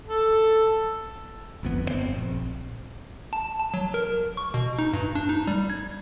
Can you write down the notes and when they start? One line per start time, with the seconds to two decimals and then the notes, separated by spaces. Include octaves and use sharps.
0.06 A4
1.63 G1 F2 B3
1.85 G1 D3 C4
2.15 A#1
3.33 A5
3.59 A5
3.74 F#3
3.94 A#4
4.37 C#6
4.54 B2
4.79 D#4
4.94 G2
5.15 D4
5.29 D#4
5.47 G3
5.70 G#6